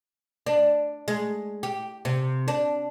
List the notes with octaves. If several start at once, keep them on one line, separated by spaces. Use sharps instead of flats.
D4
G#3
G4
C3
D4